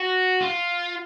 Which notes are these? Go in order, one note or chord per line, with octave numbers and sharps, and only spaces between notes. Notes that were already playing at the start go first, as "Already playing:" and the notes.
Already playing: F#4
F4